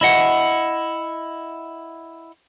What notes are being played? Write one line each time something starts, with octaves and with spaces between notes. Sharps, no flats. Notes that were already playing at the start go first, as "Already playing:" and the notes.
E4 D#5 F#5